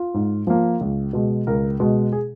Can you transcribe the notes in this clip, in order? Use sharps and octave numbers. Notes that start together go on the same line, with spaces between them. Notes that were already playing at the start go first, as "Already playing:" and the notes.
Already playing: F4
G#2
F3 A#3
C#2
B2 G#3
C#2 A#4
B2 G#3
G#4